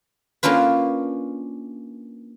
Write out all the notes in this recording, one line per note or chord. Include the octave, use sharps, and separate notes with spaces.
A#3 C#4 D4 F4 B4